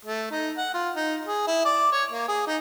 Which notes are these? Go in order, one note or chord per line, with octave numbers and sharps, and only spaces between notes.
A3
D#4
F#5
F4
D#4
G#4
E4
D5
C#5
A#3
G#4
D#4